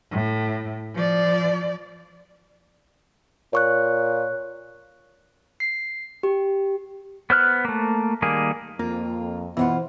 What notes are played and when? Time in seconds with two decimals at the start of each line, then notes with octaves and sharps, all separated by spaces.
0.11 A2
0.94 F3 D5
3.53 A#2 C#5 C#6 F#6
5.60 C7
6.23 G4
7.30 B3 C5 F6 F#6
7.65 A3 A#3
8.22 D#3 G3 A#3 G#4
8.79 F2 A#3 F4
9.57 B2 E3 B3 F4 C5 F#5